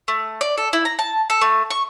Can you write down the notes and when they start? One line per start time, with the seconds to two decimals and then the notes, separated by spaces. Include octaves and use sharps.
0.08 A3
0.41 D5
0.58 A4
0.73 E4
0.85 A#5
0.99 A5
1.30 A4
1.41 A3
1.70 C#6